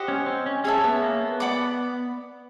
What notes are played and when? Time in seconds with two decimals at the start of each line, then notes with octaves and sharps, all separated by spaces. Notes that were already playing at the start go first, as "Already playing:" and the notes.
Already playing: G4 C5 D#5 F#5
0.08 C#4
0.26 C4
0.46 C#4
0.64 C#4 G#4 C#5 E5 A5
0.84 B3
1.03 A#3
1.21 B3
1.40 D5 F#5 B5 D6